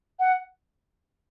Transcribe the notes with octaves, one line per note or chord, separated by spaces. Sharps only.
F#5